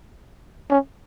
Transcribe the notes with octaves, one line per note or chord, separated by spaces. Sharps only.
C#4